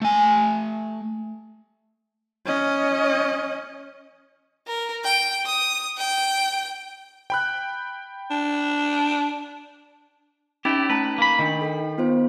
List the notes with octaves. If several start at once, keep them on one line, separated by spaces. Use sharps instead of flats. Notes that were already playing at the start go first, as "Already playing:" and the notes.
A3 G#5
C#4 D#5
A#4
G5
D#6
G5
G5 B5 F#6
D4
C#4 D#4 E4 G4 A6
A3 B4 A5 A#5
A#3 B5
D#3 D4 B6
A4 G5
B3 F4 C5